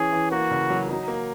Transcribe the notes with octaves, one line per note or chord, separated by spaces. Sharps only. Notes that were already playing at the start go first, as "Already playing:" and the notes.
Already playing: E3 C#4 G#4
E3
A#3 F#4
C#3
F#3
F#3 D#4
A#3